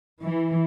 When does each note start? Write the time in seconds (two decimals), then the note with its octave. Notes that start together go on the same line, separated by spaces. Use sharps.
0.20 E3